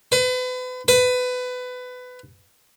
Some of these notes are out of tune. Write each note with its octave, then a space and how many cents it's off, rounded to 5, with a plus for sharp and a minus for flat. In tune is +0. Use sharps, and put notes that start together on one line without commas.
B4 +35
B4 +20